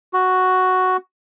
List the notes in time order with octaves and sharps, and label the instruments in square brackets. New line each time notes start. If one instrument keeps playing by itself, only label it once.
[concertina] F#4